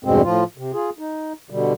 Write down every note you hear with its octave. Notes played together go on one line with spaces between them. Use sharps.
E2 G2 B2 G#3 C4
A2 F3 F4
C3
F4 G#4
D#4
B2 D3 G3